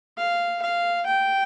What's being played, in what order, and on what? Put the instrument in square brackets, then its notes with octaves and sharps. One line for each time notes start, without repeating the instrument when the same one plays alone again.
[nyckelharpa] F5
F5
G5